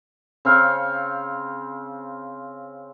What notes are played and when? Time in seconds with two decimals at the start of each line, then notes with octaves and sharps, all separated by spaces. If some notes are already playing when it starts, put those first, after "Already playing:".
0.45 C#3 C4 F5 C#6